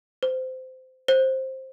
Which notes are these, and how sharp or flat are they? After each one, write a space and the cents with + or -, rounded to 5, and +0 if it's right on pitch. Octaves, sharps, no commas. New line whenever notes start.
C5 -20
C5 +10